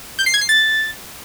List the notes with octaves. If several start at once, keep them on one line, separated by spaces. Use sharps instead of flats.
G6
C7
G#6
C7
A6